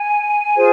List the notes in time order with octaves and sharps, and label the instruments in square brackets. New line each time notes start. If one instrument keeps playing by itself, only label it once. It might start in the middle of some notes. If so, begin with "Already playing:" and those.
Already playing: [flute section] G#5
F4 G#4 C5